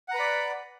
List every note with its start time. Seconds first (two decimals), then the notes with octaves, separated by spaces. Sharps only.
0.08 F#5
0.11 A#5
0.14 B4
0.17 B5
0.19 D5